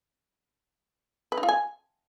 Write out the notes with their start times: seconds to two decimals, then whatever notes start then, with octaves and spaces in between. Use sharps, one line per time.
1.32 B4
1.37 D#4
1.43 F4
1.49 G#5